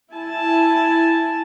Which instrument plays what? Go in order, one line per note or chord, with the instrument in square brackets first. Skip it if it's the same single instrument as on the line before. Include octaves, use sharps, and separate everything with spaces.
[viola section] E4 G#5 A5